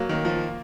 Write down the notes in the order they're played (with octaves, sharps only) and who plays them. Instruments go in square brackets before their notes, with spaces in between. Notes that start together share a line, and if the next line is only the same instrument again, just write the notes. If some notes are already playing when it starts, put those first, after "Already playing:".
Already playing: [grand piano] F#3 [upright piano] A#3
[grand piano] D#3
F3